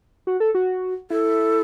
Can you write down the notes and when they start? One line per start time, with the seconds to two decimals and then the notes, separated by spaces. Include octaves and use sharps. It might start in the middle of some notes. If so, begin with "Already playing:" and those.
0.27 F#4
0.40 A4
0.55 F#4
1.10 E4 A4